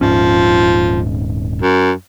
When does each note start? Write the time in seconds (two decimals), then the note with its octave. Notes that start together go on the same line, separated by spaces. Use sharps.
0.01 D#1 G#2 F3 C#4
1.62 F#2